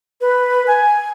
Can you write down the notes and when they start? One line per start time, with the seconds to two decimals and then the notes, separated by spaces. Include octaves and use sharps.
0.21 B4
0.67 G#5